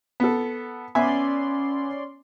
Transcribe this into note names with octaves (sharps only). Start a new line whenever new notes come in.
B3 A4
B3 C#4 D5 E5 G#5 C6